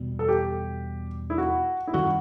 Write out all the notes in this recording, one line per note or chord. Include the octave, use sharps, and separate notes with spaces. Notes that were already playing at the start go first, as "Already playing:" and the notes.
Already playing: E2 B2 G3
A4
G4
E4
F#4
E4
F#2 D#3 G3 F#4